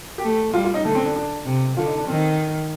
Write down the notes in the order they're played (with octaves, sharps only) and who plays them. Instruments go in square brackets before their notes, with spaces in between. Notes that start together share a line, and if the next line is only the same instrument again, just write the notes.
[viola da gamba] A3 [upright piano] G4
[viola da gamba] G3 [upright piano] F4
[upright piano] F4
D#4
[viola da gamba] D3 [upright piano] A3
[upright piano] C4
D4
D4
[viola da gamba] C3
[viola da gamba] D3 [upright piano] F4
[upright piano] D#4
D4
[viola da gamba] D#3 [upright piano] C4